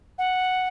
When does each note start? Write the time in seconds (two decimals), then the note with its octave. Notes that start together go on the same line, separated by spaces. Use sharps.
0.18 F#5